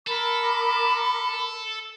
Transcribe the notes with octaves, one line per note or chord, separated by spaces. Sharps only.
A4 A#4 B5 D6